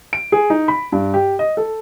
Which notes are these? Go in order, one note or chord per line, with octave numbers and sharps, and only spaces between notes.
D7
G#4
D#4
B5
G2
G4
D#5
A4